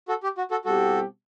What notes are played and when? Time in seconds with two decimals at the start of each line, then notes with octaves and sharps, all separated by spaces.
0.08 F#4 A4
0.23 G4
0.38 F#4
0.51 F#4 A4
0.65 B2 G3 C4 E4 F#4 G4 A4